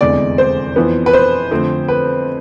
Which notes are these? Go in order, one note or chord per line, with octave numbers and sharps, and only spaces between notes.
F1 E2 D3 G#3 D5
C5
F2 E3 B3
B4
C5
F2 D3 A3 C4
B4